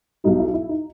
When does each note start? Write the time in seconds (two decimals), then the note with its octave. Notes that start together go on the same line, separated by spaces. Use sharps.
0.24 B1 B2 G3 D#4
0.39 E4
0.54 E4
0.69 D#4